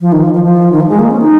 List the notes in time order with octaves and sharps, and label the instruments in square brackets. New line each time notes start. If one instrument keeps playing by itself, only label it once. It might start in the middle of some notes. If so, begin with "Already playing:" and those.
[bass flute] F3
D#3
F3
F3
F3
D#3
F3
G#3
A#3
C#4
D#4